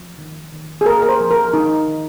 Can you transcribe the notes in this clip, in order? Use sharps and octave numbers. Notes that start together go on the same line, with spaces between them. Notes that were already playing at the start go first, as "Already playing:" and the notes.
Already playing: F3
D#3
D#3
G#4
A#3 A#4
A#4
C5
F3
A#4
D#3 D#4
D#3